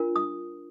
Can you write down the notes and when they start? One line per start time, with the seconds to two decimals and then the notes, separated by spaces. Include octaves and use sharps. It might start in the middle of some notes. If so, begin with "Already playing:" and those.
Already playing: D4 F4 A#4
0.16 D#6